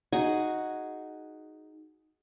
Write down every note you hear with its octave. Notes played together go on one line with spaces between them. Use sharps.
D#4 F#4 G#4 G#5